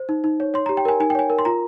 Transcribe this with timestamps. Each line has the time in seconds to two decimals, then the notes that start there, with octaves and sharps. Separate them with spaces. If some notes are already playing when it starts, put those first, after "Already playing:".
Already playing: C5
0.09 D#4
0.24 D#4
0.40 C#5
0.54 C#5 C6
0.66 G4 A#5
0.77 G5
0.85 A#4 G#5
1.00 D#4 G#5
1.10 G5
1.15 C#5 G#5
1.30 A#4
1.39 C6
1.45 F4 A#5